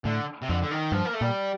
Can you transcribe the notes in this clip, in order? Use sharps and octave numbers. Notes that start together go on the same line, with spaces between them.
A2 D3
C3
F2 D3
D3
D#3
G2 F3
A#3
A3
A#2 G3